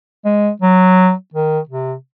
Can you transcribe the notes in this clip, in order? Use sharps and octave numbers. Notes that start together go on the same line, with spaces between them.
G#3
F#3
D#3
C3